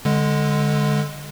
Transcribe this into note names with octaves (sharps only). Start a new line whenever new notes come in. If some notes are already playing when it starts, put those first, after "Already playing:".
D3 G#3